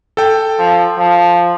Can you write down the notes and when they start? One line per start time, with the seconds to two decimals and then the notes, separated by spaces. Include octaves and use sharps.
0.17 A4 G5
0.59 F3
0.98 F3